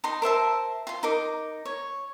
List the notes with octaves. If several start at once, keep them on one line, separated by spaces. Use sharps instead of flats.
D#4 A#5 C6
A#4 C5 E5 A5
F4 C6
D#4 A#4 D6
C#5